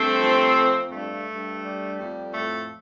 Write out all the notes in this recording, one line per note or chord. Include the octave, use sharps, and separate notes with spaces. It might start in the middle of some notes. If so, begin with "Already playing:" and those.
Already playing: G2 A3 C4
F3
F2
G2 A3
G2
G3
F2
A2 A3